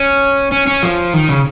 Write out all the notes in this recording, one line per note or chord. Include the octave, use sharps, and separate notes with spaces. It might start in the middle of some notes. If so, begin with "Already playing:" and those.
Already playing: C#4
C#4
C#4
F3
D#3
C#3